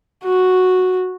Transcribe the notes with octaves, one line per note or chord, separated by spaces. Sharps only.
F#4